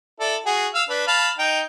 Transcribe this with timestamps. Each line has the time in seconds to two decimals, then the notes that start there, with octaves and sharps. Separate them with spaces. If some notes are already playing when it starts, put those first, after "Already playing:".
0.20 E4 A4 D5
0.46 F#4 G#4
0.74 F5 E6
0.89 D4 B4
1.07 F5 A5 B5
1.38 D#4 G5